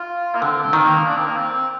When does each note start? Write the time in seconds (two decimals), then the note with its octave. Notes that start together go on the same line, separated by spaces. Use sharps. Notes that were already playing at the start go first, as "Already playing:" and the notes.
Already playing: F4
0.35 A#3
0.41 D3 C4
0.63 C4
0.73 D#3
0.84 A#3
1.06 D4
1.16 C4
1.26 A#3
1.37 C4